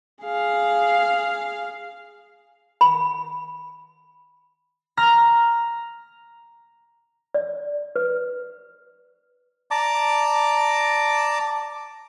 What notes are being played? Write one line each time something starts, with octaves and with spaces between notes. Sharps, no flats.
G#4 F5
B5
A#5 F6 A#6
D5
B4
D5 A5 A#5 D6